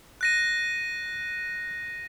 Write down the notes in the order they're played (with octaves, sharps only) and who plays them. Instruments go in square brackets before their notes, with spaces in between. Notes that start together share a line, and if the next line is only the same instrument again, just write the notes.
[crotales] F#6 A#6 D#7